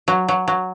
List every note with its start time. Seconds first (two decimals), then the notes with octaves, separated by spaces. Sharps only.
0.08 F#3
0.28 F#3
0.48 F#3